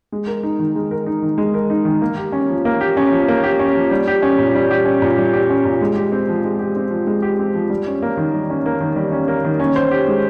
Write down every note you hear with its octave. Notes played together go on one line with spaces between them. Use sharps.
G#3
A#4
D#4
D#3
G#3
A#4
D#4
D#3
G#3
A#4
D#4
D#3
A#3
G4
C#4
F3
A#3
G4
C#4
F3
A#3
G4
C#4
F3
G3
G4
C#4
A#2
G3
G4
C#4
A#2
G3
G4
C#4
A#2
G#3
G4
C4
F3
G#3
G4
C4
F3
G#3
G4
C4
F3
G3
C#4
A#3
D#3
G3
C#4
A#3
D#3
G3
C#4
A#3
D#3
C#4
C5
G4
G#3